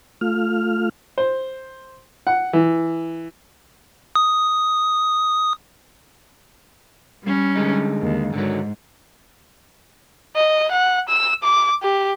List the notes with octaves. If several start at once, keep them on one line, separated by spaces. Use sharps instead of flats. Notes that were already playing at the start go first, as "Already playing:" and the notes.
A3 F4 F6
C5
F#5
E3
D#6
G3 C#4
D3 G#3 D#4
D#2
G#2 D3 D#3 F#3
D#5
F#5
E6
D6
G4